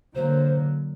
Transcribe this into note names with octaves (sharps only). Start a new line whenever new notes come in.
D3 F#3 A#3 C5